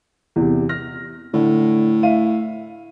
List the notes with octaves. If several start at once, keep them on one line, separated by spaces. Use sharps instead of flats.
E2 C3
F6 A#6
A2 D3
E5 F5 D#7